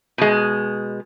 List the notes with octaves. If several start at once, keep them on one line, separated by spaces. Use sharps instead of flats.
B2 G#3